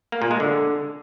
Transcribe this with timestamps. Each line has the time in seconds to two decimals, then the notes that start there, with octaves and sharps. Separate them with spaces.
0.12 A#3
0.22 A#2
0.31 G#3
0.40 D3